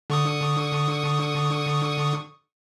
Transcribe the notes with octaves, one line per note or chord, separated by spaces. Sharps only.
D3 C#6 D#6